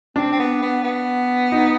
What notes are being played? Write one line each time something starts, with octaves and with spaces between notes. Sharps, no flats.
C4 D4
C4
B3
B3
B3
D#4